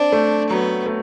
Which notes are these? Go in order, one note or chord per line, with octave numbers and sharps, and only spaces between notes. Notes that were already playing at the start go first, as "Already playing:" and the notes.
Already playing: C4 D4
A3
F#3 B3
A3